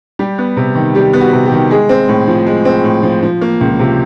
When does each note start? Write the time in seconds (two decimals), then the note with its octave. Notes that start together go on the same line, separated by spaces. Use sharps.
0.19 G3 G4
0.38 B3
0.57 C3
0.75 D#3
0.95 G3 G4
1.13 B3
1.21 F#4
1.32 C3
1.46 G4
1.52 D#3
1.70 G#3 G#4
1.89 C4
2.08 A2
2.28 F3
2.47 G#3
2.65 C4
2.84 A2
3.03 F3
3.23 F3
3.41 A#3
3.61 C#2
3.80 C3